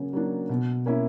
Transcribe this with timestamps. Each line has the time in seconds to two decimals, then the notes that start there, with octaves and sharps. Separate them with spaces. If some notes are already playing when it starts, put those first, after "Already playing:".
Already playing: C#3 F#3 A#3
0.13 F#3 A#3 D4
0.49 B2
0.86 A#3 C#4 E4